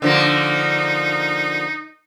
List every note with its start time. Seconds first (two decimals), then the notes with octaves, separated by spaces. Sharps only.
0.02 D3 F3 A#3 D#4